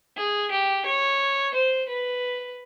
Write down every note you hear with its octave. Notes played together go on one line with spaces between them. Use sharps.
G#4
G4
C#5
C5
B4